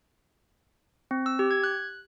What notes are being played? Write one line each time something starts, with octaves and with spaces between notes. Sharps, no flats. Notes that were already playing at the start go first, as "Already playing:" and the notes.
C4
E6
G4
G#6
F#6